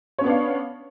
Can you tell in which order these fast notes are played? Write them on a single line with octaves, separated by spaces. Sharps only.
C#5 C#4 B3 D4 F5